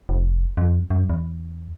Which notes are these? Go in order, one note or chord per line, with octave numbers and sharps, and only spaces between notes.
F1
F2
F#2
E2